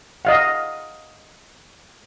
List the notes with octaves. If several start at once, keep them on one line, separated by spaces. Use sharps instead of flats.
D#5 F5 F#5